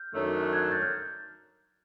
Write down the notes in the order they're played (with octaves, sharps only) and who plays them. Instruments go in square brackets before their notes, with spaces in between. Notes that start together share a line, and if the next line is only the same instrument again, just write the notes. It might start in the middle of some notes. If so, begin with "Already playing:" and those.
Already playing: [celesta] F6 G6
[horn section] F#2 D#3 F#3 A3 D4
[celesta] F#6 G#6
G6 A6
F6 G6